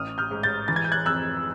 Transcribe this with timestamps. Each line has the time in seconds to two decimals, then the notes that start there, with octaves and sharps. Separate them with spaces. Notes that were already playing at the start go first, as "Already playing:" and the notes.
Already playing: A1 D#6 F6
0.18 F6 G6
0.31 G#2
0.43 G6 A6
0.68 E3 A6
0.76 G#6
0.84 G6
0.92 F#6 G#6
1.06 F2 E6 F#6